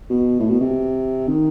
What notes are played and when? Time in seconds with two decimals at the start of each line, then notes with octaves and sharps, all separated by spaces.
0.10 B2
0.40 A2
0.50 B2
0.61 C3
1.27 D#3